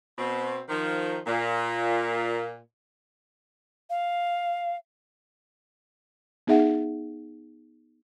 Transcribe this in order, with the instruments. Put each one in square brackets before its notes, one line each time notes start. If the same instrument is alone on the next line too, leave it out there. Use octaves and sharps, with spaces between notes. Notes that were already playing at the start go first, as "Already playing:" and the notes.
[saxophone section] B2 C4
D#3 F3
A#2
[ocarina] F5
[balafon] B3 D#4 G#4 E5 F#5